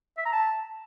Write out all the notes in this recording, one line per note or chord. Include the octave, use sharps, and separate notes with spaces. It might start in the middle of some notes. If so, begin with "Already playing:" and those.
E5
A#5
A5